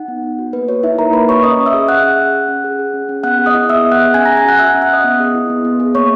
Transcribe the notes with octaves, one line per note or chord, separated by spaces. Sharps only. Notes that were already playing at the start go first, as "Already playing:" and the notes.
Already playing: D#4 F#5
B3
B3
F#4
A#3 B4
F#4 C#5
D#4 E4 E5
A#3 A#4 A#5
A#3 B4 B5
F#4 C#5 C#6
C#4 D#5 D#6
C#4
E5 E6
G#4
G#4 F#5 F#6
C#4
C#4
C#4
C#4
G#4
G#4
C#4
C#4
B3 F#5 F#6
G#4
D#5 D#6
E4
B3 E5 E6
B3
F#5 F#6
G#4
C#4 G#5 G#6
C#4 A#5 A#6
G#5 G#6
F#4 F#5 F#6
F#4 E5 E6
F#5 F#6
C#4
F#5 F#6
C#4 D#5 D#6
B3
G#4
E4
B3
B3
G#4
A#3 C#5 C#6